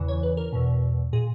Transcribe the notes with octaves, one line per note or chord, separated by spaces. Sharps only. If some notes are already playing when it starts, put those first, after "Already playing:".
Already playing: E2 C#3 E3
C#5
B4
A#4
E2 B2
A#2 G#4